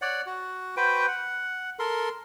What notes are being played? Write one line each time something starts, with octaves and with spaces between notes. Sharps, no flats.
C#5 D5 F#5
F#4
F#4 B4 C5 G5
F#5
A4 A#4 C6